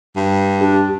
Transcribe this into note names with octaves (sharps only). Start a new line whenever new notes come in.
G2
D4 G4